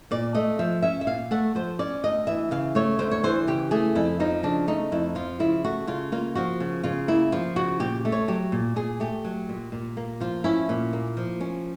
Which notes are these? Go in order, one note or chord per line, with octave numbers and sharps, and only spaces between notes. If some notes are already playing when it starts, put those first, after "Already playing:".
A#2 D5
A3 D#5
F3 E5
C#4 E5
E5
A#2 F5
A3 F#5
F3 C5
C#4 D5
D2 D#5
E3 E5
C#3 F5
A3 C#5
D2 C5
C#5
E3 C5
C#3 G4
A3 G#4
F2 E4
F3 D#4
C#3 D4
A3 D#4
F2 E4
F3 F4
C#3 E4
A3 F#4
C#3 F4
A#3 F4
F3 F#4
C#3
C#3 F4
A#3 E4
F3 F4
C#3 F#4
A#2 G4
A3
C#5
F#3 G4
A#2
A#2 G#4
A3 G4
F#3
A#2
A#2
A#3
F3 F4
C#4 E4
A#2
A#3
F3
C#4